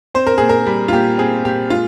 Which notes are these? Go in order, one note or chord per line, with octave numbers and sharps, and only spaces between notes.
C4 C5
A#4
A#2 G#4
A#4
G3
F4
A#2 G4
C4 G#4
A#2 G4
G#3 F4